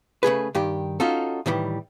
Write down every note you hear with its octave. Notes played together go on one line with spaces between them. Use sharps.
C#3 A3 G#4 B4
G2 D#3 G4
C#4 D#4 F4 F#4 A4
A2 D#3 E3 G3